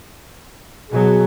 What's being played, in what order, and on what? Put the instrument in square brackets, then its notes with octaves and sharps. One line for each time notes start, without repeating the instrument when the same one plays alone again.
[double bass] B2 F#3 [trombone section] G#4